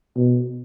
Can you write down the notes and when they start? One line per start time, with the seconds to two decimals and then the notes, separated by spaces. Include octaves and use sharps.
0.16 B2